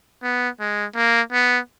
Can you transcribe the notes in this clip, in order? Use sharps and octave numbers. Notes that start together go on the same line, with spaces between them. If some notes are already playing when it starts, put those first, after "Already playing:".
B3
G#3
A#3
B3